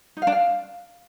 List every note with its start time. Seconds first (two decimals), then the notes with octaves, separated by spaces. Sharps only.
0.17 D#4
0.22 F5
0.27 D4
0.32 F5